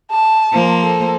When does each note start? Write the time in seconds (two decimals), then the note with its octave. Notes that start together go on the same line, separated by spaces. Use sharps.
0.11 A5
0.52 F3 A#3 C5
0.83 A4